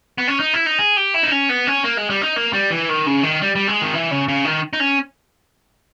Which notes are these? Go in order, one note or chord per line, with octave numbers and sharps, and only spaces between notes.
B3
C#4
D#4
E4
D#4
G#4
G4
E4
D#4
C#4
B3
C#4
A#3
G#3
G3
D#4
A#3
G3
E3
D#3
C#3
D#3
G3
G3
G#3
D#3
E3
C#3
C#3
D#3
D#4
C#4